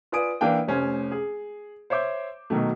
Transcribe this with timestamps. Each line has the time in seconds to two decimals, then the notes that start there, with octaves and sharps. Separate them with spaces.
0.12 F4 B4 D5 G#5 D#6 D7
0.41 E3 A#3 D4 F5 G5
0.68 F1 A3 C#4 C5 G#5
1.12 G#4
1.90 C5 C#5 E5 D6 G6
2.50 B2 D#3 F#3 A3